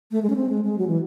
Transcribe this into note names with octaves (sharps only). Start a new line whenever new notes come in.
A3
G#3
C#4
C4
G#3
G#3
F#3
E3